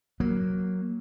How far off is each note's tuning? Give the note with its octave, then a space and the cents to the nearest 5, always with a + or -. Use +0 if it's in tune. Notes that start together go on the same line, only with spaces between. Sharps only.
F#3 +0 A#3 +0